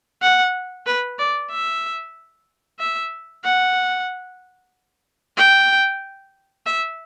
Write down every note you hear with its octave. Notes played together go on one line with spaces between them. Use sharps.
F#5
B4
D5
E5
E5
F#5
G5
E5